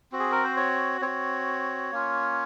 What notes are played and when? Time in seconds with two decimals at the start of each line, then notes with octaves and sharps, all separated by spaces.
0.12 C4 F#4
0.19 G#4
0.32 A#4
0.44 C5
0.56 C#5
1.01 C4 F#4 C#5
1.92 A#3 C#4 F4